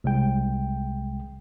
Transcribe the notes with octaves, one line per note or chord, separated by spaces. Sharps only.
C2 G#3 G5